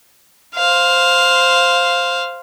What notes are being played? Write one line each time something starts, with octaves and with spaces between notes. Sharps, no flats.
C5 F5